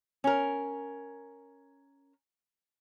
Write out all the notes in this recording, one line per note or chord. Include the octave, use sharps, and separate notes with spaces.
C#4 A#4